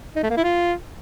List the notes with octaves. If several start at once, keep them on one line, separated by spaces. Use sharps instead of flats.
D#4
A3
A#3
E4
F4